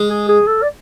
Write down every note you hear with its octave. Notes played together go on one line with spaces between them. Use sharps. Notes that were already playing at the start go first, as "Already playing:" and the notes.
Already playing: G#3
G#4
G#4
A4
D5